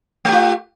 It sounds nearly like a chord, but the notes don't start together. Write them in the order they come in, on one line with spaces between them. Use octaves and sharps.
A3 G4 F4